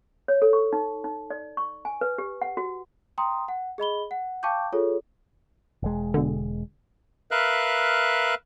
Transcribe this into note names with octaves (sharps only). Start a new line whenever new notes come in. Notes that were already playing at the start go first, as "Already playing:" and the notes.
C#5
A4
C#6
D#4
D#4
D5
C#6
G#5
B4
G4
F#5
F#4
G5 A#5 C6 D#6
F#5
G#4 D#5 B5 G7
F#5
F5 G5 A5 C#6 D6 G6
F4 G#4 A4 C#5
E1 G#3
B2 D3
A#4 B4 E5 F5 F#6